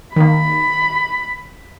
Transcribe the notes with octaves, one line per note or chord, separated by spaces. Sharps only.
D#3 A#3 B5